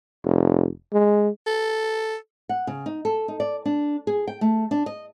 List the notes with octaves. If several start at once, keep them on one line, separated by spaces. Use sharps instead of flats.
F1
G#3
A4
F#5
C#3
D#4
A4
D#4
D5
D4
G#4
G5
A3
D4
D#5